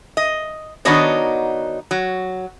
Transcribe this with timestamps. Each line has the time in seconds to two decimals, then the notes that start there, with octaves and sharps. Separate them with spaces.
0.17 D#5
0.85 D#3 B3 D4 D#4 F#4 C#5
1.91 F#3